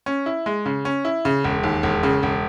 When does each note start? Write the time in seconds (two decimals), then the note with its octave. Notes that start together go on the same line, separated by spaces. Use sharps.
0.06 C#4
0.26 E4
0.46 G#3
0.66 C#3
0.85 C#4
1.05 E4
1.25 C#3
1.44 E1
1.63 D#2
1.83 E1
2.03 C#3
2.23 E1